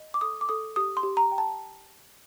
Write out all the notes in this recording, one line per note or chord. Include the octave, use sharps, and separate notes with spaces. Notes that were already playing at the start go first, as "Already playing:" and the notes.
Already playing: D#5
D6
A4 D#6
D6
A4 D#6
G4 D#6
C6
G4
A#5
G5
A5